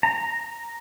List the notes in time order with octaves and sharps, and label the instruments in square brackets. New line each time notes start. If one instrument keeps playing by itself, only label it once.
[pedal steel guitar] A#5